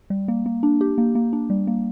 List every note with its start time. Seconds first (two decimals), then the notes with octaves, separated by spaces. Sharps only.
0.10 G3
0.28 A#3
0.46 A#3
0.63 D4
0.81 G4
0.98 A#3
1.15 A#3
1.33 D4
1.50 G3
1.67 A#3